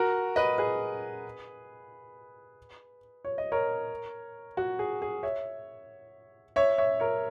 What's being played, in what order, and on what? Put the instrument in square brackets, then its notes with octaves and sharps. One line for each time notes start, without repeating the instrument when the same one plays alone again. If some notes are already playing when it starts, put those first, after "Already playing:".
Already playing: [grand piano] F#4 A#4
B4 D#5
G#4 B4
C#5
D#5
A#4 C#5
F#4
G#4
G#4
C#5 E5
C#5 E5
C#5 E5
A#4 C#5